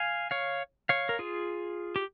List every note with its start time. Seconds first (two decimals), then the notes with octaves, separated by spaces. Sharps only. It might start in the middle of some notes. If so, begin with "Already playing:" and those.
Already playing: F5 G#5
0.31 C#5 F5
0.89 C#5 F5
1.09 A#4
1.19 F4 G#4
1.96 G4